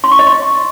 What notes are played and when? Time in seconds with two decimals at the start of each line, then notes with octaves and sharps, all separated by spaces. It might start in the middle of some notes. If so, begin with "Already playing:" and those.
0.04 C6
0.11 C#6
0.19 D#5
0.27 C6